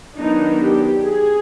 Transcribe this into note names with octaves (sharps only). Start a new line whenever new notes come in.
D#3 F#3 B3 D4 D#4
G4
G#4